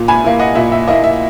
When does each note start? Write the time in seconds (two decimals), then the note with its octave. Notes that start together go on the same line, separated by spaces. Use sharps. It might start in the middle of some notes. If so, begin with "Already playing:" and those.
Already playing: A#2
0.08 G#5 B5
0.24 A#3 E4
0.39 D#5 F#5
0.55 A#2 E5
0.72 E5
0.87 A#3 D#5
0.90 E4
1.04 E5